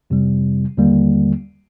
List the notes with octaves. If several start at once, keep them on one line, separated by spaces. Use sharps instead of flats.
F2 C3 G3
D#2 D3 G3 A#3